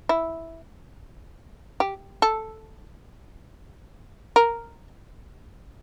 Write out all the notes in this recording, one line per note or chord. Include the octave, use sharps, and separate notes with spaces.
E4
G4
A4
A#4